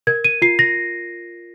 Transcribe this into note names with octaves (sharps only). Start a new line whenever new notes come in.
A#4 G#6
D#7
F4 C7
A#6